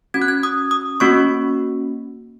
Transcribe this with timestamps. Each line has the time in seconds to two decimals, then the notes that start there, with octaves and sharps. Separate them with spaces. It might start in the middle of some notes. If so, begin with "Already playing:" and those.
0.14 C#4 F#4 G#6
0.22 F#6
0.28 G#6
0.43 D#6
0.71 D#6
1.00 A#3 C#4 F#4 C#6